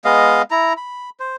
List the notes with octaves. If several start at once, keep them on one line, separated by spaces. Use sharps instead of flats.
G#3 B3 D#5 F5
E4 A#5
B5
C5